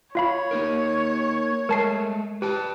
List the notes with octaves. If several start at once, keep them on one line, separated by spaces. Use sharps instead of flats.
F4 C#5 F5 B5
A#3 D#4 A#4
G#3 A3 A#4 A5 C7
G4 B4 G5 A5